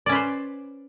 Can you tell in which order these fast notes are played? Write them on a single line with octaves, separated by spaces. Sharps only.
D5 C#4 B4 C5